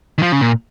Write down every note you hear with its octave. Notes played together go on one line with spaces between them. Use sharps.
D#3
F3
C#3
A#2